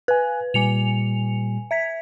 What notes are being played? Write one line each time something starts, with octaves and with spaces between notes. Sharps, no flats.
B4 G#5 F#6
A#2 G3 G#5 C#7 F7
E5 G#6 B6